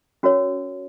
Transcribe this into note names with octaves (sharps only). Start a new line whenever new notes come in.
C#4 F#4 A#4 C#5